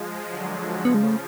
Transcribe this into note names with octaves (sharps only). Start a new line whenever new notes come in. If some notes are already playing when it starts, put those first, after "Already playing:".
Already playing: F3 G#3
D3 F#3
C#3 F3 B3
G#3
A3